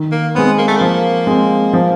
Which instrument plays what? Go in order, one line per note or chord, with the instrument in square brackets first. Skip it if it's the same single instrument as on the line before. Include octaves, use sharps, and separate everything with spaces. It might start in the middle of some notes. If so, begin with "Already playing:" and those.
Already playing: [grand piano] D#3
[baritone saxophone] A#3
[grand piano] G#3 C4 [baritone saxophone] B3
[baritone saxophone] A#3
A3
[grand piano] F3 [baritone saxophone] A#3
[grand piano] G#3 C4
F3